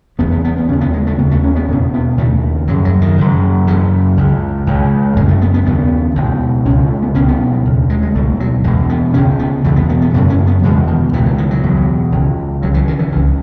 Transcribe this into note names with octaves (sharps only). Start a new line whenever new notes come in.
E2 C#3 B3
B3
B3
B3
D#2 C#3 C#4
B3
G#3
A3
D#2 C#3 B3
A3
C#4
B3
E2 B2 C#4
B3
D#2 C#3 A3
F#2 C#3 F#3
F#3
D#3
F#2 C#3
F#2 C#3 E3
C#2 C#3
C#2 C#3
F#2 C#3 G#3
A3
B3
B3
D#2 C#3 B3
C#2 B2
C#2 C#3 C#4
A3
B3
C#2 B2 C#4
B3
F#3
D#2 C#3
G#3
G#3
C#2 B2 A3
F#3
E2 B2 G#3
B3
C#2 C#3 C#4
B3
E2 B2 A3
B3
B3
B3
F#2 C#3 A3
C#4
B3
E2 B2 G#3
D#3
C#2 B2 E3
E3
D#3
F#3
E2 B2
C#2 C#3
C#2 C#3 F#3
E3
D#3
E3
C#2 C#3 E3